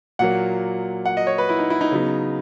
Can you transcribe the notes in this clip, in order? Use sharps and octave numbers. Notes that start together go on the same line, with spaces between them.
A#2 F#3 A#3 F#5
F#5
D#5
C#5
B4
E4
D#4
E4
D#4
C#3 F#3 B3